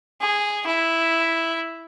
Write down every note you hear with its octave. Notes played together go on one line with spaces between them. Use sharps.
G#4
E4